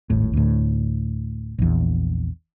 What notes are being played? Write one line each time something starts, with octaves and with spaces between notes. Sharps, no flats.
D#1 G#1 A2
D2 A2
A#1 E2